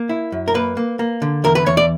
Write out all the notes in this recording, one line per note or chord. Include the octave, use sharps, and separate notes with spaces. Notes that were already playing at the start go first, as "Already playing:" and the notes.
Already playing: A#3
E4
F#2
A#4
A#3 B4
A#3
A#3
D3
E2 A#4
B4
E2 C#5
D5